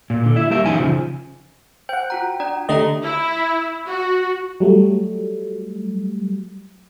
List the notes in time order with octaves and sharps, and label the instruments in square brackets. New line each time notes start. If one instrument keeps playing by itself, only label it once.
[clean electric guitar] A#2
D3
E4 E5
G3 A#3 A#4 E5
F#2 E3 D#4 G#5
C#3 F3
[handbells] C5 [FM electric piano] F#5 G5
[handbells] F4 F#4 A#5
D4 D5 A#5
[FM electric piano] D3 A3 D#5 [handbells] G4 D5 A#5
[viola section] E4
F#4
[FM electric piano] F#3 G3 A3